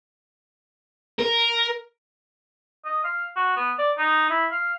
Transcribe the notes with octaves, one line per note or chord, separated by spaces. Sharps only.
A#4
D#5
F5
F#4
B3
D5
D#4
E4
F5